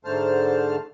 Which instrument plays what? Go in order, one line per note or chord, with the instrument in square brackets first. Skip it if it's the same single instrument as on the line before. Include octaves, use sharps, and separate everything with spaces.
[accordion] G#2 D3 A3 C5 A5 F6